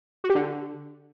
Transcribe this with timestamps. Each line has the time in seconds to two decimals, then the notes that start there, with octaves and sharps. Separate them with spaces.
0.24 F#4
0.30 G4
0.35 D3